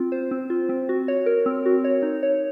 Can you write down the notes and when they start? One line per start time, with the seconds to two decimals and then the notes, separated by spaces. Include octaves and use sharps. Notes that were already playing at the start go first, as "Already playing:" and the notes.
Already playing: C4 F4
0.12 C5
0.31 C4
0.50 F4
0.69 C4
0.89 F#4
1.08 C#5
1.26 A#4
1.46 C4
1.66 F#4
1.84 C#5
2.03 D#4
2.23 C#5